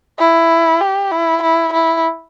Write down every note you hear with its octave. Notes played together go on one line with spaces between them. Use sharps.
E4
G4
E4
E4
E4